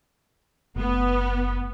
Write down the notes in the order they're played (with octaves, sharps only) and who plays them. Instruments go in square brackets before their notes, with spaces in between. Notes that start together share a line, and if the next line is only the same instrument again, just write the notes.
[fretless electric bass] F#1 A3 [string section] B3